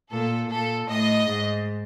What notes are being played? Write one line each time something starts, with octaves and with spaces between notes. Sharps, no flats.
A#2 A4
A#2 A4
A2 D#5
G#2